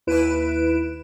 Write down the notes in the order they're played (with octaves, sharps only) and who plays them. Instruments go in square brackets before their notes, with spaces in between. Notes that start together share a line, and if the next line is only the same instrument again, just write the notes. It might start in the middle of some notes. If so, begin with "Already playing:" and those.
[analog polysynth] D#2 E4 B4 D7 E7